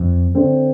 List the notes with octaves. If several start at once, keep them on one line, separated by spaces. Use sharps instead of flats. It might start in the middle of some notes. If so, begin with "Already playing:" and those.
Already playing: F2
D3 A3 C4